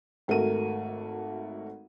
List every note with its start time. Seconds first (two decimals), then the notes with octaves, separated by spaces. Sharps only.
0.28 G#1 A3 F#4 A#4 D#7